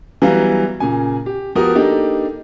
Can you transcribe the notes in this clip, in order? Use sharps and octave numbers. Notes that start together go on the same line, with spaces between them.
E3 F#3 G3 B3 F5 A#5
A#2 C#3 G#5
G4
F3 B3 F#4 G4 A#4 D#6
A#3 D4 D#4 G4 A4